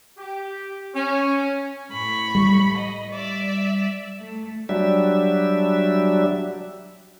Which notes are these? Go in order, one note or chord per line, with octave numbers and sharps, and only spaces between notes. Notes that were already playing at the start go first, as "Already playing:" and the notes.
G4
C#4
A2 B5 C#6
G3
D#5
D5 E5
A3
F#3 G3 D4 E5